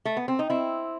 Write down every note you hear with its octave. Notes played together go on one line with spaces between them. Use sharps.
A3
B3
C4
D#4
C4 E4